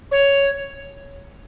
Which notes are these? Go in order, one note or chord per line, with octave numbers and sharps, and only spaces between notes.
C#5